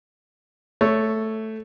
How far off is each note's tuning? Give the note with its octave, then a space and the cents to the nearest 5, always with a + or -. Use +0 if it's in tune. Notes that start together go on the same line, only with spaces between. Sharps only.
A3 +0 C#5 +0